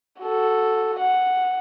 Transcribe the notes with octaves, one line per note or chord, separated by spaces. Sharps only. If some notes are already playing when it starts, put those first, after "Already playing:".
F#4 A4
F#5